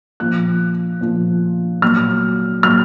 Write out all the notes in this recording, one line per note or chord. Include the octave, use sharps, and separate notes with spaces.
A#2 F3 F#6
A#2 F3
A#2 F#3 F6
A#2 F#3 F6